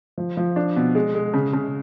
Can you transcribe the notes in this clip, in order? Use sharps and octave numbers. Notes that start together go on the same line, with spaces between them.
F3
F3
D4
B2
G#3
G#3
C#3
C#3